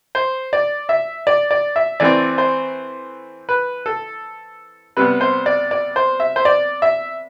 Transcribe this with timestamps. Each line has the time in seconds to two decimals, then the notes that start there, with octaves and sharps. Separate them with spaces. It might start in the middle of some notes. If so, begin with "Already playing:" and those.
0.15 C5
0.53 D5
0.89 E5
1.27 D5
1.51 D5
1.76 E5
2.00 E3 A3 C4 D5
2.38 C5
3.49 B4
3.86 A4
4.97 C3 G3 B3 B4
5.21 C5
5.46 D5
5.71 D5
5.96 C5
6.20 E5
6.36 C5
6.45 D5
6.82 E5